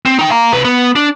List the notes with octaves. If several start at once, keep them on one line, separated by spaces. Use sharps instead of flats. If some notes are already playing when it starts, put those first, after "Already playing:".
C4
D#4 G5
F5 A#5
C3 B4
B3
D4